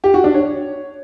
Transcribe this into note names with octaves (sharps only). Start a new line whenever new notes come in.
G4
F#4
D4
C#5